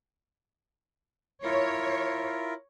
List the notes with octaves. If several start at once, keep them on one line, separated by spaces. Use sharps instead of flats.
E4 F4 A#4 C#5